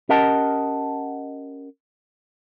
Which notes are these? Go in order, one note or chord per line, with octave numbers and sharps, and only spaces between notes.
C#4 G4 A#4 D#5 F#5 A5